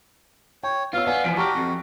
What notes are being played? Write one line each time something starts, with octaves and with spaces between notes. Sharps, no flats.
C#5 G5
B3 F4 C#5 F5 E6
B3 D5 G#5
E3 F3 G#5 B6 D7
F#4 G4 A5 A#5 F6
F2